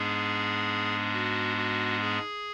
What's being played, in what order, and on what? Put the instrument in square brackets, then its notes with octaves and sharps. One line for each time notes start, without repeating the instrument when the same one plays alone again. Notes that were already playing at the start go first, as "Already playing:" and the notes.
Already playing: [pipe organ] G#2 G#3 B3 D4 G#4
F#4
F#4
G#4